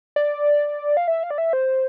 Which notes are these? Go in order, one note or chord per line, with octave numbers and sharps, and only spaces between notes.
D5
F5
E5
F5
D5
E5
C5